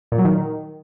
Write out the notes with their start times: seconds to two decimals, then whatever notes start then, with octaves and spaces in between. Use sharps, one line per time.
0.12 A#2
0.18 F#3
0.25 D#3